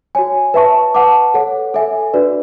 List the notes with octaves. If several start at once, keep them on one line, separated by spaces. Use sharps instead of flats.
F#4 C#5 G#5
B4 E5 A5 C#6
B4 F#5 A5 D6
A4 C#5 F#5
A4 E5 G#5
D4 F#4 B4 D5